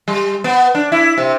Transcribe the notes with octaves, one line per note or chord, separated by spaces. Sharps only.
G3
B3
D4
E4
C3